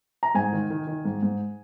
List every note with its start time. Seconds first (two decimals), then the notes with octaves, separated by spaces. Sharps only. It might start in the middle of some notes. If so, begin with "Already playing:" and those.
0.23 A#5
0.35 G#2 G#5
0.52 D#3
0.70 D#3
0.87 D#3
1.05 G#2
1.23 G#2